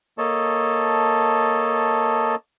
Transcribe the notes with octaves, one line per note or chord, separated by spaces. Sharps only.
A#3 A4 C#5 D#5 A5